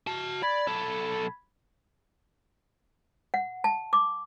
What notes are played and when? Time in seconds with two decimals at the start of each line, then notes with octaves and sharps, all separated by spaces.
0.07 F#4 A5
0.43 D5 B5 G#6 B6
0.68 B1 A4
3.34 F#5
3.64 A5
3.93 D6